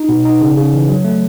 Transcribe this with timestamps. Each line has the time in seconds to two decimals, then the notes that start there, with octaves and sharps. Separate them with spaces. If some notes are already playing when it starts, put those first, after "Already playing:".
Already playing: D#4
0.09 B2
0.25 D#4
0.41 C#3
0.57 C#3
0.74 E3
0.89 F#3
1.05 A3